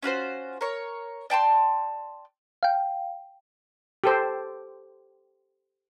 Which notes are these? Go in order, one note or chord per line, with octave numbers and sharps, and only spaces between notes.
C#4 F4 F#4 C5
A#4 C#5
D5 G5 A5 C6
F5 G5
G4 A4 C5